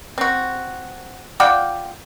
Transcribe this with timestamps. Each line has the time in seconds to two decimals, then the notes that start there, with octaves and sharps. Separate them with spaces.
0.18 C4 F#4
1.40 F4 D5 F#5 G5